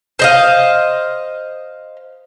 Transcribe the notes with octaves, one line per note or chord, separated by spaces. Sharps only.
C5 D#5 F5